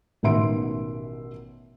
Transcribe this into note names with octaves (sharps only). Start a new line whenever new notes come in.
A1 B2 D#3 E5 C6 D7